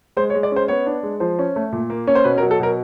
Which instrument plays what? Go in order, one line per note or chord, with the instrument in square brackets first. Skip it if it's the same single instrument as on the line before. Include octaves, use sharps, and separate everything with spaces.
[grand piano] G#3 C5
C#5
G#3
D5
C#4 C5
B3 C#5
D4
G#3
F3 C5
C#4
A3
A#2
A#3
C#4 C#5
C5
B2 B4
A#4
F#3
A4
B2 A#4